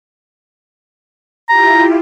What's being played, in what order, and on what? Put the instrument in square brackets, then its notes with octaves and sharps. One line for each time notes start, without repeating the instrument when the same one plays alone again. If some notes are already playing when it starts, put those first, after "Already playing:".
[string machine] E4 F4 G4 [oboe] A#5